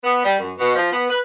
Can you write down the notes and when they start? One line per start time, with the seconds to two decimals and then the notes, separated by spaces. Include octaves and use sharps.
0.04 B3
0.23 G3
0.39 F#2
0.58 B2
0.75 F3
0.91 B3
1.10 B4